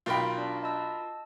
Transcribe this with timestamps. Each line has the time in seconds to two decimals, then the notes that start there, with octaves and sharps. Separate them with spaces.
0.06 B1 F4 A#4 G5 B5
0.38 D4 D5 A5
0.63 D#5 A5 E6